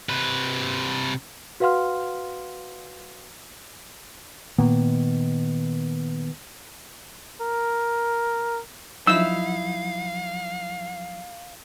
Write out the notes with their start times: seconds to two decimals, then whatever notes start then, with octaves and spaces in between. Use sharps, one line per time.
0.09 C3 B4
1.60 F#4 B4 F5 F#5 C6 F6
4.59 A#2 D#3 A#3 B3
7.41 A#4
9.07 F3 F#3 D#4 E4 F5 E6